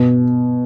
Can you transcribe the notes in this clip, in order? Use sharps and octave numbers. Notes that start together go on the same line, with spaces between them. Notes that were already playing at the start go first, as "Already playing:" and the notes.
Already playing: B2